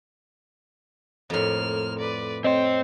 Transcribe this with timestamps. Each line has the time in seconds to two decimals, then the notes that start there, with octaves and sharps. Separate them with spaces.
1.30 F2 A2 A#3 F6
1.99 B4 D5
2.44 C4 C5 C#5 D#5